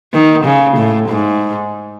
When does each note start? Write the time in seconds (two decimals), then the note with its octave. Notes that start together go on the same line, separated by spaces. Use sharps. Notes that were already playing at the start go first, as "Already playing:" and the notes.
0.13 D#3
0.44 C#3
0.77 A2
1.08 G#2